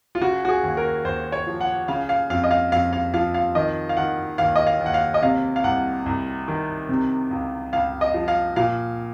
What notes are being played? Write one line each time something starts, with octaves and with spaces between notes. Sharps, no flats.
F4
C#3 F#4
F#4
G#4
D#2
A#4
D#2 C5
C#5
F3
F#5
C#3 F5
F5
F2 F5
D#5
F5
F2 F5
F5
F3 F5
F5
D#3 D#5
F5
D#3 F#5
D#2 F5
D#5
F5
D#2
F#5
F5
D#5
C3 F5
F5
C2 F#5
C2
D#3
C3
C#2
C#2 F5
D#5
F3
F5
A#2 F5